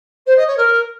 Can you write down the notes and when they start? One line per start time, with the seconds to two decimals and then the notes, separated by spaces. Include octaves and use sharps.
0.26 C5
0.36 D#5
0.47 C#5
0.57 A#4